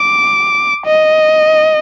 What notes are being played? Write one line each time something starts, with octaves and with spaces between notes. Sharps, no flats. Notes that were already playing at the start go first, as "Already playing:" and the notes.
Already playing: D6
D#5